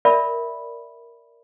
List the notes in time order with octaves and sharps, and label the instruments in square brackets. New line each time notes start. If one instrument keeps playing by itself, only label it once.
[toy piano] A#4 D5 E5 B5